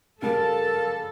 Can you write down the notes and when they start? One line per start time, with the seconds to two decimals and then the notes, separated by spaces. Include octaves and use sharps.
0.22 C#3 G3 A4 A#4 F5 A5